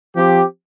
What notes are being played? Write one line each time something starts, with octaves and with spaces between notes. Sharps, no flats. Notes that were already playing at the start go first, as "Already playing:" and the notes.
F3 C4 G4